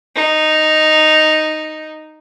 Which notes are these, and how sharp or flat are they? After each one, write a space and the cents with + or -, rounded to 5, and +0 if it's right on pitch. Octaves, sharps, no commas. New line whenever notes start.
D#4 -5